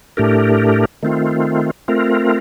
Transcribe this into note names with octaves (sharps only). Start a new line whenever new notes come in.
A2 A3 D4 G4 A#4
D#3 A3 C4 F4
A3 C4 F4 A#4